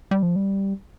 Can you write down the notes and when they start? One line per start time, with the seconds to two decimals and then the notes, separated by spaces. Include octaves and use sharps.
0.11 G3
0.23 F3
0.36 G3